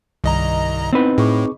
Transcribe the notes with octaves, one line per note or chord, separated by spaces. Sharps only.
C2 G2 D#3 D#5 A#5
B3 C4 D#4 E4 B4
A2 G#4 C#6 D6